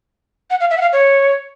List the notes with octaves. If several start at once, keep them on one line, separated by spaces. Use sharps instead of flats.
F#5
F5
E5
F#5
F5
C#5